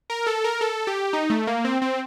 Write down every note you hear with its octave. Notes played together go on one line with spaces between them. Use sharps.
A#4
A4
A#4
A4
G4
D#4
A3
A#3
C4
C4